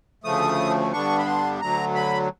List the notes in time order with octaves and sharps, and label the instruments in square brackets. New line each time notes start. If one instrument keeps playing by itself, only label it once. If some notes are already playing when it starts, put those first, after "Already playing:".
[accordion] D2 C#3 F3 A3 D#6
G2 D3 G3 B3 D4 C#6
B5
C6
D2 D3 F#3 A#5
B5